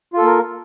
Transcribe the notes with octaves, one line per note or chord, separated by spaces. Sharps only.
A#3 F4 A4 A#4